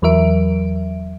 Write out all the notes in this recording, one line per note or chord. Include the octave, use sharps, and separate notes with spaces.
E2 E3 F#3 A#4 E5 D7